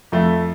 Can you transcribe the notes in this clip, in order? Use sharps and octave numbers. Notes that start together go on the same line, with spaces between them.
F2 A3